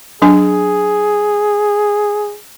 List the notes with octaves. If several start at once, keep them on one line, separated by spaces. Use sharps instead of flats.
F#3 D4 G#4 G#5